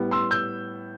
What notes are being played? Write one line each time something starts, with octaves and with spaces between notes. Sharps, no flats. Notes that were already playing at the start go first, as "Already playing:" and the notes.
Already playing: A2 G3 B3
C6 E6
E6 G6